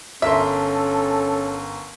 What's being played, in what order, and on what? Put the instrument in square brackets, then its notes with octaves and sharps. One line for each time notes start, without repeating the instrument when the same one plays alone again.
[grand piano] G1 A#4 C6 [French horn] C#4 [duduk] A4 [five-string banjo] E5